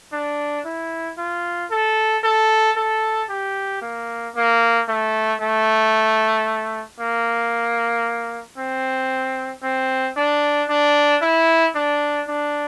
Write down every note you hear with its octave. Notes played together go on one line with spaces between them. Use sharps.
D4
E4
F4
A4
A4
A4
G4
A#3
A#3
A3
A3
A#3
C4
C4
D4
D4
E4
D4
D4